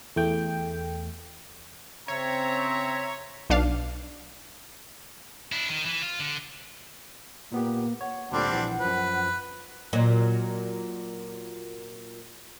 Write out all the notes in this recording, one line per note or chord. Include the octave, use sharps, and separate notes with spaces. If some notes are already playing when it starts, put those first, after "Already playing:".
E2 A3 G5
C#3 C4 C#5 E5 A#5
B1 D4 F5
D4 E4
D#3
E3
F4
D3
A#2 A#3 B3 G4
C#5 F#5
D2 A#2 D3 G3 C4 D4
A#1 E3
F#2 F3 B4
A#2 F#3